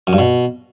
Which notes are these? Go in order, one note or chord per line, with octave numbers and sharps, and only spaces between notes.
F#2
G2
B2